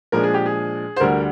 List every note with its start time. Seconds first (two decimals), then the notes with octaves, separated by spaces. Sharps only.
0.12 A#2 F3 G#3 D4 A#4
0.23 G#4
0.34 G4
0.46 G#4
0.96 C5
1.00 D2 D3 G3 D4 A#4